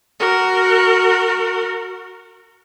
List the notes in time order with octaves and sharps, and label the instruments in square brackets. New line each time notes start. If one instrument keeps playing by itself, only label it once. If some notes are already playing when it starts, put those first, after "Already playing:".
[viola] F#4 A#4